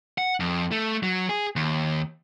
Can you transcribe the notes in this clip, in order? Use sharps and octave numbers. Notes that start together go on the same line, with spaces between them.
F#5
F2
A3
F#3
G#4
D#2